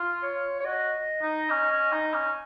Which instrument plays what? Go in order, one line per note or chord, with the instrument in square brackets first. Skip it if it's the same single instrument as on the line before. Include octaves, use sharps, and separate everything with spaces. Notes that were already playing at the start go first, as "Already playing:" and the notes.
Already playing: [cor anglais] F4
[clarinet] C#5
C#5
[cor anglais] F#4 [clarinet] D#5
[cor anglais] D#4
C#4
C#4
D#4
C#4